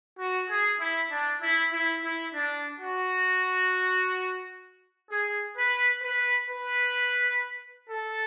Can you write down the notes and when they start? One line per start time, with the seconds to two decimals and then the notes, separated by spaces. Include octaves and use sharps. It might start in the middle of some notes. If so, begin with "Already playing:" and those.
0.18 F#4
0.49 G#4
0.80 E4
1.11 D4
1.42 E4
1.72 E4
2.03 E4
2.34 D4
2.79 F#4
5.10 G#4
5.57 B4
6.03 B4
6.49 B4
7.88 A4